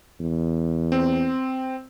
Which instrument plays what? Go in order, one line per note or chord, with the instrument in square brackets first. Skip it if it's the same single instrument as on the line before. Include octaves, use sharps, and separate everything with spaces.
[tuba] E2
[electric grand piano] C4